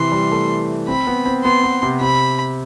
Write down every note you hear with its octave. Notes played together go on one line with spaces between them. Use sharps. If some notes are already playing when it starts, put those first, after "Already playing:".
Already playing: C3 E3 C6
G3
A3
C4 B5
B3
C4
B3 C6
B3
C3
C3 B5